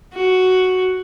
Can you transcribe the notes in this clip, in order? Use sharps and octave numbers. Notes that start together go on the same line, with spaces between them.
F#4